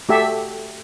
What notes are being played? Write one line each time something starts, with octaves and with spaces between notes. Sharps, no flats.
A3 F#4 G4 A4 E5